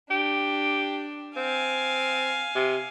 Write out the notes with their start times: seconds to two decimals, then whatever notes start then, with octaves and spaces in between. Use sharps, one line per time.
0.11 D4 G4
1.36 C4 F5 G#5
2.55 C3